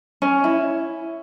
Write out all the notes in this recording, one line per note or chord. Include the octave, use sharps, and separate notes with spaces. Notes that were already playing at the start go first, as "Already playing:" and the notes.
C#4
E4